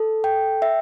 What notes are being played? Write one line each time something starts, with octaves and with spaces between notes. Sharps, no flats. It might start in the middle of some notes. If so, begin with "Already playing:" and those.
Already playing: A4
G5
E5